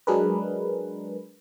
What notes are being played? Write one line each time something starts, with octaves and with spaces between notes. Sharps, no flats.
F#3 G#3 D4 G#4 A#4 B4